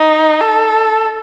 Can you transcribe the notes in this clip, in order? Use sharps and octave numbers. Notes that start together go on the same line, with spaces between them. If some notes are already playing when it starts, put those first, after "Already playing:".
Already playing: D#4
A4